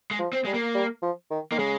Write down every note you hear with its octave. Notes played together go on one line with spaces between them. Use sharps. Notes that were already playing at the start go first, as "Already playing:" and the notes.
G#3
F3
C4
G3 G#3
A#3
G3
F3
D#3
D#3 A#3
C#3 G#3